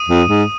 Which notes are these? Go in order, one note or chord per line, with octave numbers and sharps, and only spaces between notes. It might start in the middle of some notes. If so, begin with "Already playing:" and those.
Already playing: D#6 D#7
F2
G#2